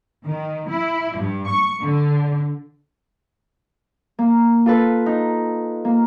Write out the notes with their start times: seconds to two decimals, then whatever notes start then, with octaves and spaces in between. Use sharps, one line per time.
0.25 D#3
0.69 E4
1.16 G2
1.47 C#6
1.82 D3
4.19 A#3
4.66 F4 A4 B4
5.06 D#4
5.85 A#3